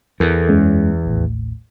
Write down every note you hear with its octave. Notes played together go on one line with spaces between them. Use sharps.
E2 A4 A#4
F#2 G#3 C#4
A1 D#2 A2